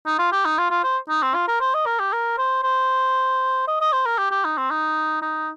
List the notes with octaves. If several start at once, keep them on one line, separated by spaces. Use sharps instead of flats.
D#4
F4
G4
D#4
F4
F4
C5
D#4
C4
F4
A#4
C5
D#5
A#4
G4
A#4
C5
C5
D#5
D#5
C5
A#4
G4
G4
D#4
C4
D#4
D#4